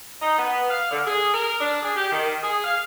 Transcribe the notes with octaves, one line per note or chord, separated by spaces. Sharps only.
D#4
B3
F5
D3
G#4
A#4
D4
G#4
G4
D#3
G#4
F5